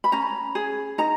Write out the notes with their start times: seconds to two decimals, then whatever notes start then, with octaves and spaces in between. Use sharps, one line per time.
0.04 B5
0.12 C#4 A#5
0.55 G#4
0.98 D#4 A#5